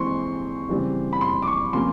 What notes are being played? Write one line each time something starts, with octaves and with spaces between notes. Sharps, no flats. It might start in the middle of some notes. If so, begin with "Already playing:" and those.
Already playing: E3 G#3 C4 C6 C#6
C#3 E3 G3 C4
B5
C6
D6
C#6
C3 F3 A#3 C#4 C6